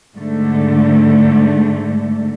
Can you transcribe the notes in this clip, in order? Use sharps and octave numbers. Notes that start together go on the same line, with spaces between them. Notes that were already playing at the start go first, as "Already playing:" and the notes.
G#2 D3 A3